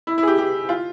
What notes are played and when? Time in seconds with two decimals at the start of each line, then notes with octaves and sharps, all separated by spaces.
0.07 E4
0.18 E4
0.23 G#4
0.27 G4
0.38 G4
0.69 F4